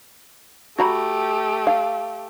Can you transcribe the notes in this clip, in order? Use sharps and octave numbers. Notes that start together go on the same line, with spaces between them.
A3 F#4 G4 A#5 B5
F5